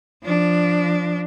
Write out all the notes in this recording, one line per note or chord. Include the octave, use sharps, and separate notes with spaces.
F3 D4